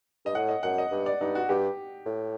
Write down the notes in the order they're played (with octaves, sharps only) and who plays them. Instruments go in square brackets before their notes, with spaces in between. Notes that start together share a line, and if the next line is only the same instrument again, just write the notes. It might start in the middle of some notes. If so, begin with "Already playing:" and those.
[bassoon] G2 [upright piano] D#5
[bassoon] A2 [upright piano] F#5
[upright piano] D#5
[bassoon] F#2 [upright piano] F#5
[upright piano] D#5
[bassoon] G2
[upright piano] D5
[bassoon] G2 [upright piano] D#4
[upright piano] F#4
[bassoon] G2 [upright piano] G4
[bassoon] A2